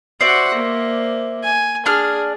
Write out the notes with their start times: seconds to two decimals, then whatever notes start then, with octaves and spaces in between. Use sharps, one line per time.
0.21 F#4 C5 D5 E5 F#5
0.54 A#3
1.43 G#5
1.86 D4 G#4 F6